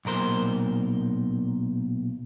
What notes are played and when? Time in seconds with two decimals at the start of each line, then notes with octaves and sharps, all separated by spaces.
0.05 B1 A#2 A#4 C5